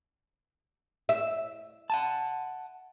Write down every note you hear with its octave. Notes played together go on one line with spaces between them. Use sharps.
E5
F#5 G#5 A5